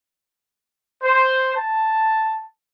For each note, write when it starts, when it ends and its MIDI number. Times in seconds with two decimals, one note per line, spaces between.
1.03 1.53 72
1.56 2.42 81